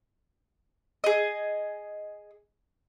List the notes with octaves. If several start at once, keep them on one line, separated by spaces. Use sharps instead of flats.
G#4 D#5